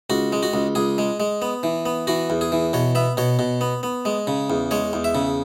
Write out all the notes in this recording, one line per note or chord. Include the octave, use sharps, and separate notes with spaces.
C#2 F#4
G#3
F#4
C#2
C#2 G#4
G#3
G#3
B3
E3
B3
E3 F#4
E2
G#4
E3
B2 C#5
B3 E5
B2 C#5
B2
B3
B3
G#3
C#3
E2
G#3 C#5
E2
E5
C#3